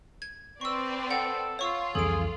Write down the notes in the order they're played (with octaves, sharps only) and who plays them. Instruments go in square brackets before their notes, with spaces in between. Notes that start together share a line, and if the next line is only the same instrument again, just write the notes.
[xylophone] G#6
[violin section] C4 B4 D5 [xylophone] C#6 E6
[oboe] A4 [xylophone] F#5 G5
[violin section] F4 [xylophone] C#5 C#6 E6
[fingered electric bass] C2 F2 E3 [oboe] G#4 [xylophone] A4 D7